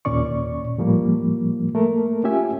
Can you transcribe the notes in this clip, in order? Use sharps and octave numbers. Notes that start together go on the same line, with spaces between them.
D#2 A#2 C#4 D5 C#6
A2 F3 G3 A#3
A3 A#3 A4 A#4
C#4 F4 G4 E5 G#5